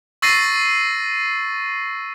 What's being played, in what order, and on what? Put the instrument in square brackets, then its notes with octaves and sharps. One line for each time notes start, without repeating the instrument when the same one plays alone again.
[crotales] C#6 E6 A6 A#6 C7 D#7